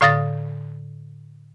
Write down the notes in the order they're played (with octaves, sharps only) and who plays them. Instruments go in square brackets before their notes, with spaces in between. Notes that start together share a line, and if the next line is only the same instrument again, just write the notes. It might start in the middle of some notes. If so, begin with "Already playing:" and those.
[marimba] A2 D3 F5 D#6 A6 A#6